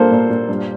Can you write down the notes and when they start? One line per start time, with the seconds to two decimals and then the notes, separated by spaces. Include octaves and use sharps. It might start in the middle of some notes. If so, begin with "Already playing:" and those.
Already playing: A#2 G3 A#3 A4 C5
0.11 A#2
0.30 A#2
0.49 G2